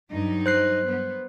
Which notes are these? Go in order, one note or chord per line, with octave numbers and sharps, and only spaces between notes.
G2 F#3 D#4
C5 F#6 C7
B3